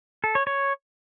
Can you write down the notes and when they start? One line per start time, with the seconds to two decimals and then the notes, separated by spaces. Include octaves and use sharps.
0.24 A4
0.35 C#5
0.47 C#5